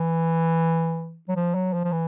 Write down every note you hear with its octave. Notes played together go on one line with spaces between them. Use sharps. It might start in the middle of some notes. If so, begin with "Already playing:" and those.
Already playing: E3
F#3
F3
F#3
F3
F3
E3